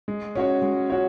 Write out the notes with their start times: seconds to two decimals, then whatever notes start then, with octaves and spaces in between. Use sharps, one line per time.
0.08 G#3
0.35 C#4 F#4 C#5
0.62 G#3
0.90 C#4 F#4 C#5